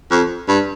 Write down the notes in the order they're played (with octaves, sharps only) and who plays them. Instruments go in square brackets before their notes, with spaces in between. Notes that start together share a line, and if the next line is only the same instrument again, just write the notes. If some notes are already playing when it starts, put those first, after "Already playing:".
[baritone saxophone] F2
G2